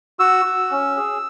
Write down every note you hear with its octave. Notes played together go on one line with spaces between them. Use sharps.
F#4 E6
F#4
C#4
G#4